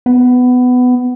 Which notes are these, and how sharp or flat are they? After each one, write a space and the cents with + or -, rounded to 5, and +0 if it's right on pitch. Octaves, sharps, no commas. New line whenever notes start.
B3 +15